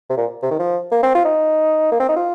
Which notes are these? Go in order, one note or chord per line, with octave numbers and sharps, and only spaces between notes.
C3
A#2
C3
D#3
F3
A#3
C4
F4
D#4
A#3
C4
D#4
F4